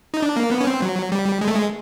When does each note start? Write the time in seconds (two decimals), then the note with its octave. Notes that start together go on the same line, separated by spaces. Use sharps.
0.14 D#4
0.22 D4
0.37 A#3
0.51 B3
0.61 C#4
0.67 C4
0.82 F#3
1.12 G3
1.41 G#3
1.48 A3
1.56 G#3